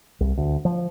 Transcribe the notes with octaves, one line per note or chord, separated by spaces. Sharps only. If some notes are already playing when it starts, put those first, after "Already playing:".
C2
D2
F3